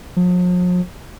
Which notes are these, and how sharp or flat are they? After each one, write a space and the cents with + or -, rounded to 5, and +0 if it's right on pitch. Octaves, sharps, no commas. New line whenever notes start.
F3 +45